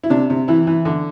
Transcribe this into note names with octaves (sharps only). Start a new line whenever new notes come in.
E4
C3 D4
C3
E3 E4
E3
D3